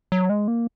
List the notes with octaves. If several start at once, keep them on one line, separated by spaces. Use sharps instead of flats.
F#3
G#3
A#3